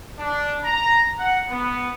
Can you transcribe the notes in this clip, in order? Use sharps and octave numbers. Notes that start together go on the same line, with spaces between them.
D4
A#5
F#5
B3